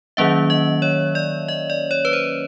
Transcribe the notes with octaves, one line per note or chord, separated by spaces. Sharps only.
D#3 F#3 A#3 C#4 E5
D#5
C#5
D5
D#5
D5
C#5
B4
C5